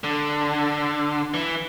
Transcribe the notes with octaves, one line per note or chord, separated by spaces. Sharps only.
D3
E3